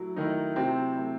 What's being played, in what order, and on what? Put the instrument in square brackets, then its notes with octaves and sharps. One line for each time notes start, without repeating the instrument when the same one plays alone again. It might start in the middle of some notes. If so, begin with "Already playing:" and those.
Already playing: [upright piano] F#3 A3 E4
[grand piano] D#3 D#4 [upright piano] A3 E4
[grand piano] C3 C4 [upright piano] F#3
[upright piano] A3 E4